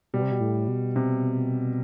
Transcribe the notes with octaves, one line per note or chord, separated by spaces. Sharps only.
B2 G3
C3
B2
A2
B2
C3